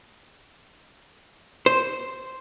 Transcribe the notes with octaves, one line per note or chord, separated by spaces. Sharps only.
C5